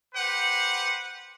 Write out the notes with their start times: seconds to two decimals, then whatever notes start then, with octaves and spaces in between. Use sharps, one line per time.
0.14 G4 B4 C5 F#5